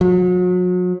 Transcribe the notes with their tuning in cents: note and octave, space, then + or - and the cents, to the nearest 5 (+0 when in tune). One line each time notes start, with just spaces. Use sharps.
F#3 -40